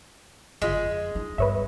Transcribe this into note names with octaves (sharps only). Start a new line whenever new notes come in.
G1 F2 G#3 F4 B6
D4 D#4
G2 B3 B4 C#5 E5